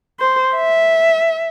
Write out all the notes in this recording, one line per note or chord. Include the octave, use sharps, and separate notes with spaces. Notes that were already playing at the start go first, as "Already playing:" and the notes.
C5
E5